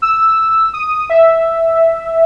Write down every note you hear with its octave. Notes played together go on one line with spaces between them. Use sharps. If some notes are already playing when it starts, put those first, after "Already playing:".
E6
D#6
E5